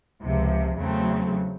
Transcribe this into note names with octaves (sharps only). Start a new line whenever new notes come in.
C#2 C3 F3
E2 C#3 F#3 A3 C4